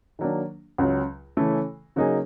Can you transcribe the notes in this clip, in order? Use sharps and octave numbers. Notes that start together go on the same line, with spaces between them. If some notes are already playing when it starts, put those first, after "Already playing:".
D#3 F#3 A#3 D4
C#2 C#3 F#3
C#3 E3 A3 C#4
C#3 F#3 A#3 D#4 G#4